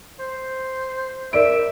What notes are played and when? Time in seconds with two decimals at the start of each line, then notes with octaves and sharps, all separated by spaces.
0.20 C5
1.33 A#4 D5 E5 D7